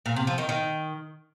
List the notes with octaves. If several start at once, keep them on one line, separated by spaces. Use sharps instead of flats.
A#2
C3
F3
D#3
D#3